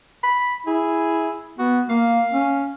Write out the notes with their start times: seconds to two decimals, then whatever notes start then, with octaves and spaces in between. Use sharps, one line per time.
0.23 B5
0.67 E4 G#4
1.59 B3 F#4
1.90 A#3 F5
2.34 C#4